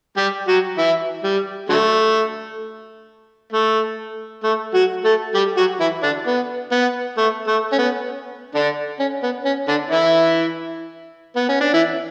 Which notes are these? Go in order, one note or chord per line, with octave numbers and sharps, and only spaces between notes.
G3 G4
F#3 F#4
E3 E4
G3
D3 F#3 A3
A3
A3
F#3 F#4
A3 A4
G3 G4
F#3 F#4
E3 E4
D3 D4
B3
B3
A3
A3
C#4
B3
D3 D4
C#4
B3
C#4
D3 D4
E3 E4
B3
C#4
D4
E3 E4